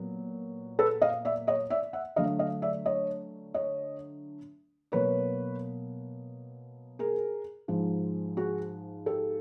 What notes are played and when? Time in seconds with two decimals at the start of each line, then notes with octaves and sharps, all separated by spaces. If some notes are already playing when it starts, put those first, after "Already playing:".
Already playing: A#2 F#3 B3
0.79 A4 B4
1.02 D#5 F5
1.25 D5 E5
1.47 C#5 D#5
1.70 D5 E5
1.93 E5 F#5
2.16 D3 F#3 A3 D4 D#5 F5
2.39 D#5 F5
2.62 D5 E5
2.86 C#5 D#5
3.54 C#5 D#5
4.92 B2 F#3 A#3 B4 C#5
6.99 G#4 A#4
7.68 G#2 F3 G#3
8.37 F#4 G#4
9.06 G4 A4